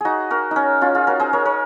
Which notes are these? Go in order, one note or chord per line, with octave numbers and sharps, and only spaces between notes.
D#4 F#4 G#4
F#4 A#4
C#4 D#4
C#4 F4
F4 G#4
F#4 A#4
G#4 C5
A#4 C#5
A#4 C#5